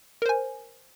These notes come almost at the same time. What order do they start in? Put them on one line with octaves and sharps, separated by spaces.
A#4 C5 G#5